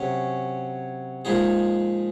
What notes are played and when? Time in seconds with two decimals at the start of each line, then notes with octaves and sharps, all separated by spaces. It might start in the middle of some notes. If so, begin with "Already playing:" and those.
Already playing: C3 F#3 C#4 G#4 C#5
1.25 A#2 F3 G#3 D#4 G#4